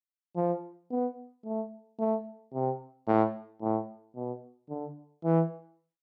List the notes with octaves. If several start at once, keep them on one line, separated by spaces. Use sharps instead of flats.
F3
B3
A3
A3
C3
A2
A2
B2
D3
E3